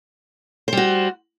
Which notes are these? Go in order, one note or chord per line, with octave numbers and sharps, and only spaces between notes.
G3 F#4 C5